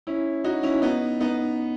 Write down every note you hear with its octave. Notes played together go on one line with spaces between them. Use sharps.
C#4 E4
D#4 F#4
C#4 E4
B3 D#4
B3 D#4